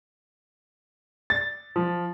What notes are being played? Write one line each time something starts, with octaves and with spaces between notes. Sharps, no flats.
A6
F3